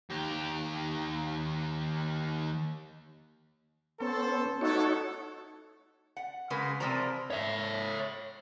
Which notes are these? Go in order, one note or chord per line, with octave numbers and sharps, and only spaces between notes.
D#2 G4
B3 C#4 A4 C5
A3 D#4 F#4 A4 C#5
F#5
C#3 G#3 A#4 B4
C3 E3 F3 G3 C5 A#5
C#5 E5